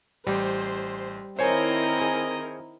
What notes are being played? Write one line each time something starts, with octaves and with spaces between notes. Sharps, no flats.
A1 G3 G4 C5
D#3 C4 E4 A#4 C5 C#5 D#5 G#5
G#4